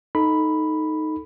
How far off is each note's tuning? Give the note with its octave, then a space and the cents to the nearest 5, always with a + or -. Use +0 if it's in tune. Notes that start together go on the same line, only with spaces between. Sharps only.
D#4 +0 A4 +0 B5 +0